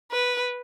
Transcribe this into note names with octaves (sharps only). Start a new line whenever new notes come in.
B4